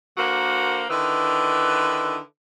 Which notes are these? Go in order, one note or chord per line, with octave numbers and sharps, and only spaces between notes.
D3 A#3 F#4 A#4 C5
D3 D#3 E4 B4